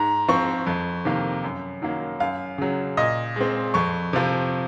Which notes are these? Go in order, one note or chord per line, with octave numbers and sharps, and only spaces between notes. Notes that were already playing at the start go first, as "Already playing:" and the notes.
Already playing: G#2 A#5
F3 C4 C#6
F2
C3 D#3 A#3
F#2
D#3 F#3 A#3
F#2 F5
C#3 F#3
A#2 D#5
G#3 C4
F2 C#6
C3 F3